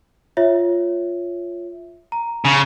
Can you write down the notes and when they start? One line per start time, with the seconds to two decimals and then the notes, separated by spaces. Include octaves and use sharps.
0.37 F4 C#5 E5
2.12 A#5
2.45 C#3